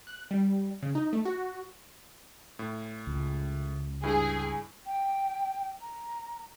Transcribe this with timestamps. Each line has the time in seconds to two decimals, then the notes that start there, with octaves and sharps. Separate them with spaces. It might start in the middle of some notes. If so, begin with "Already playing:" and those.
0.07 F#6
0.31 G3
0.83 C#3
0.95 D#4
1.13 A3
1.25 F#4
2.59 A2
3.07 C#2
4.03 G2 E4 G#4
4.86 G5
5.81 A#5